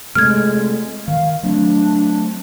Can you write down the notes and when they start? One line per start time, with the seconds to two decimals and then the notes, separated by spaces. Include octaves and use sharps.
0.15 C3 G#3 A3 F6 G#6
1.08 D#3 F5
1.43 F#3 A3 C4 D4